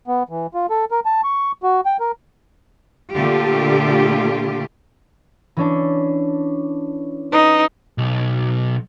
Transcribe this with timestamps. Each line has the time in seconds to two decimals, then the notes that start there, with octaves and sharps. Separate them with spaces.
0.08 B3
0.29 E3
0.54 F4
0.70 A4
0.91 A#4
1.06 A5
1.24 C#6
1.63 F#4
1.86 G5
2.00 A#4
3.14 A#2 D3 A3 F4 G4
5.57 E3 C#4 D4
7.32 D#4 B4
7.98 B1